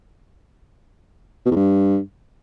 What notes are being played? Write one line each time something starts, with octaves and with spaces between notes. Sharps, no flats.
B2
E2
G2